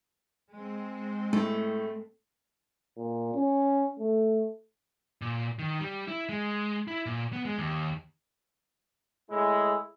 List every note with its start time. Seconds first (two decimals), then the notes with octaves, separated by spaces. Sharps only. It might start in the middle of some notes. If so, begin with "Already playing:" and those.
0.54 G#3 C4
1.33 A2 A3
2.97 A#2
3.35 C#4
3.99 A3
5.22 A#2
5.59 D#3
5.80 G3
6.08 E4
6.29 G#3
6.88 E4
7.06 A#2
7.33 B3
7.45 G#3
7.58 D#2
9.31 A2 G#3 E4